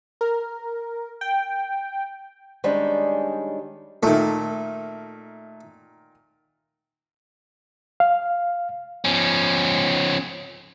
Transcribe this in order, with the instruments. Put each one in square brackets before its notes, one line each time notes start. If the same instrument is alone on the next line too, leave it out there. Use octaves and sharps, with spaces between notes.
[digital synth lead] A#4
G5
[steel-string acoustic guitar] D#3 G3 G#3 C#4 D4
[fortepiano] A#2 D#3 [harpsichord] A3
[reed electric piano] F5
[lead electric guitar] F3 C#4